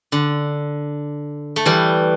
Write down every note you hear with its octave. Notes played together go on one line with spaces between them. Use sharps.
D3
A3
E3 G3